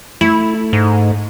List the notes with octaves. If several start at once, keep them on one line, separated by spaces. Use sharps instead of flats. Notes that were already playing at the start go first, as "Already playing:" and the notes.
A3 E4
G#2